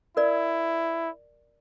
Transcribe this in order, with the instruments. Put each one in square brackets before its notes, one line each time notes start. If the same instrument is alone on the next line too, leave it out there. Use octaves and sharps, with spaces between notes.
[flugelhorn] E4 [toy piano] A#4 D5